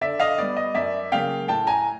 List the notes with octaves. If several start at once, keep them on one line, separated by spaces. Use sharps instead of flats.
D3 D5 E5
D#5 F5
G3 B3 D5
D#5
F#2 D5 E5
C#3 F#3 A#3 F5 G5
A2 G5 A5
G#5 A#5